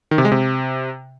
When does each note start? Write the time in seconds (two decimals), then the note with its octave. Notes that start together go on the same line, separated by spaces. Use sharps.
0.11 D#3
0.18 C3
0.25 G#3
0.32 C3